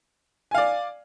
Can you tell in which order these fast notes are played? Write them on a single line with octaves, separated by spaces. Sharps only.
G#5 F5 D5